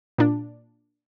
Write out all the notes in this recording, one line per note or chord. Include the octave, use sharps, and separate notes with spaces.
A#2 D4